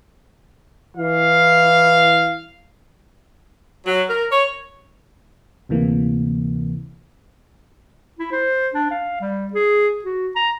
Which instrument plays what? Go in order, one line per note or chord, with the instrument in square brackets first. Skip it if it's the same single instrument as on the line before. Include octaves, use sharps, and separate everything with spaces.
[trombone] E3 [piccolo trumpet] F5
[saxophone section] F#3
A#4
C#5
[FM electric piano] D2 C3 E3 A#3
[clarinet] E4
C5
D4
F5
G3
G#4
F#4
A#5